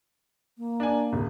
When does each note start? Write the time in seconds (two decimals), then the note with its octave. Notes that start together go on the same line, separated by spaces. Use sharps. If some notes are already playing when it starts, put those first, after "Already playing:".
0.58 A#3
0.80 D4 G#5
1.13 D1